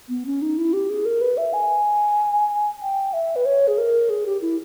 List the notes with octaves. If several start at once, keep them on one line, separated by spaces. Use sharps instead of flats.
B3
C#4
D#4
E4
G4
G#4
A#4
B4
E5
G#5
G5
E5
B4
C#5
G#4
A#4
G#4
G4
E4